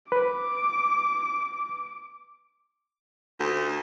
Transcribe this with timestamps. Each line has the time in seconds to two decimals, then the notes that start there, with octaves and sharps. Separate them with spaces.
0.12 B4 D6
3.40 D2